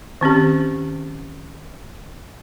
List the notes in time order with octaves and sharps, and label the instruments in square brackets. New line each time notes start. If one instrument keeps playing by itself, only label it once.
[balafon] D#3 C4 C#4 G4